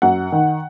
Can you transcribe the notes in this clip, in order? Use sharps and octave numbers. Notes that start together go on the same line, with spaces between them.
F#2 F#5
D#3